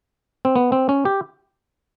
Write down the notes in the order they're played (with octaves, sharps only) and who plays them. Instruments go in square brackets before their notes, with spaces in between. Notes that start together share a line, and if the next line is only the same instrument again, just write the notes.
[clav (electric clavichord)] C4
B3
C4
C#4
G4